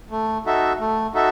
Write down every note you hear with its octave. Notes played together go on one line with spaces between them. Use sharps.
A3
D#4 F#4 A4 E5
A3
D#4 F#4 A4 E5